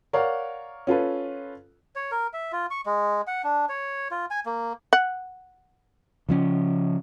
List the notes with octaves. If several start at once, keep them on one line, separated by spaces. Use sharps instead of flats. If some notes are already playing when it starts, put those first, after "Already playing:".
A#4 C#5 D5 F5 F#5
C#4 F4 A4 B4
C#5
A#4
E5
F4
C#6
G#3
F#5
D4
C#5
F4
G#5
A#3
F#5
C#3 F3 C#4